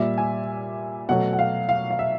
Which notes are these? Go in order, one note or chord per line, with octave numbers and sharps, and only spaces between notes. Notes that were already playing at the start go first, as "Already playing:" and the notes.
Already playing: A#2 G3 E5
G#5
B2 F#3 A3 F#5
F#5
F5
F5
F5
E5